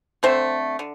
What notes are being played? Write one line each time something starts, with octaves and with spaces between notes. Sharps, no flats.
D3 A3 C4 C5
D3